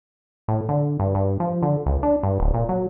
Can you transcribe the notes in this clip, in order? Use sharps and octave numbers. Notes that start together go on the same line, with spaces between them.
A2
D3
G2
G2
F3
D3
C#2
D4
G2
D1
A#2
F#3